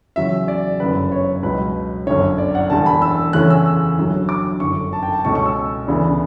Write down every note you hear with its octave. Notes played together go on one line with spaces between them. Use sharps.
E2 C#3 F#3 C#4 E5
D5
G1 F#2 C#3 B4
C#5
C#2 B2 F#3 B4
G1 F#2 D3 C#5
D5
F#5
E1 E2 D3 G3 A5
B5
E6
E2 C#3 E3 A3 C#4 F#6
E6
E6
G1 G2 F#3
D6
G1 F#2 D3 C#6
A5
G5
A5
C#2 B2 A3 C#4 C#6
C#6
E6
D2 C#3 E3 B3 D4